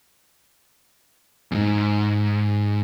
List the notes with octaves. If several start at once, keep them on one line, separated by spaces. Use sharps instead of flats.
E2 G#2